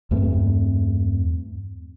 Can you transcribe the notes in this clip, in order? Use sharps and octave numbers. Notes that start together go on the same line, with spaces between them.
E2 G2 A3 C4